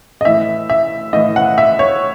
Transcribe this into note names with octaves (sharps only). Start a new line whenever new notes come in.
D#5
A2 E3 E5
E5
A2 E3 D#5
F#5
E5
C#5